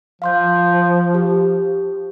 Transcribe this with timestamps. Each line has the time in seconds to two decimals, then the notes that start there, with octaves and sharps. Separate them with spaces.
0.22 F3 F5 C6 G6
1.15 G4